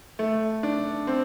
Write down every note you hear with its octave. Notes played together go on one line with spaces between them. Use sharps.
A3
D4
C4